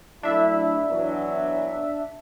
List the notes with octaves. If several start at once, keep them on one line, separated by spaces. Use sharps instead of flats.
F#3 A3 D4 E4 E5
B2 E3 F#3